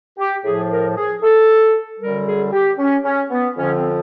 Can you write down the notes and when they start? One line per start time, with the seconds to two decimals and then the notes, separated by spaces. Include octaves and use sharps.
0.18 G4
0.44 A2 F3 G#4
0.71 A#4
0.96 G#4
1.22 A4
2.00 F#2 D3 G3 A#4
2.26 G#4
2.53 G4
2.79 C#4
3.04 C#4
3.30 B3
3.56 F2 D3 F3 C#4
3.76 C4